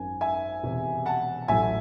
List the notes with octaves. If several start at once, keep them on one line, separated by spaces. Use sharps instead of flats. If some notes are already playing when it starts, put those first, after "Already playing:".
Already playing: G#1 F#2 D#3 G#5
E5 G#5
E1 E2 C3
F#5 A5
A1 A2 F#3 A3 E5 G#5